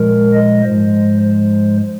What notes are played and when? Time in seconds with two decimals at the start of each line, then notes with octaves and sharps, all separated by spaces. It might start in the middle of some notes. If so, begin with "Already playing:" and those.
Already playing: A#2 F3 G#3 A#4
0.34 D#5
0.63 G#2 F3 G#3 C5
1.22 C5